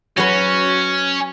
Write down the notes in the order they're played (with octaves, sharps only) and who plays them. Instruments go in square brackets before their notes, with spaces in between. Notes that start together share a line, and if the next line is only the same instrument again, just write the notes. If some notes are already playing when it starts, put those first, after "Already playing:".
[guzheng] F#3 B4 [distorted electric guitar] C#4 [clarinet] F#4